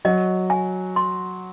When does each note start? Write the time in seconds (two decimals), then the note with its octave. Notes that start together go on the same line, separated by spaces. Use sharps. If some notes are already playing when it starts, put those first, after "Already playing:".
0.05 F#3 D#5
0.50 G#5
0.96 C6